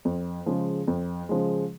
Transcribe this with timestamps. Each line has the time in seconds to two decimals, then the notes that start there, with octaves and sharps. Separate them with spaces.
0.05 F2
0.46 C#3 F3 G#3
0.87 F2
1.29 C#3 F3 G#3